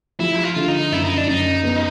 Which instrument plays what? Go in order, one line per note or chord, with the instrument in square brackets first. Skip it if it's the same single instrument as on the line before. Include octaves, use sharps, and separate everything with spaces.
[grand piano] F3 [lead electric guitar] E4
[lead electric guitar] F4
[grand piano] D3
[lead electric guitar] D#4
[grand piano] F#2 [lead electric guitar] E4
[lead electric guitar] D#4
D4
[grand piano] F#2 [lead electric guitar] D#4
[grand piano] B3